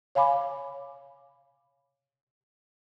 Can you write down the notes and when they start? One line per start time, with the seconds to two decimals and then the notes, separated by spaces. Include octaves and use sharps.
0.15 C#5 F5 G#5 B5 D6